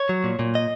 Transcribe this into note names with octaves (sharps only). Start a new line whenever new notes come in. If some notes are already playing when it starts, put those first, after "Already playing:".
Already playing: C#5
F#3
A#2
A#2
D#5